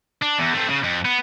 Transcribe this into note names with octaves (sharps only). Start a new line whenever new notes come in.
D4
E2
A3 C4
C#3
F2
B3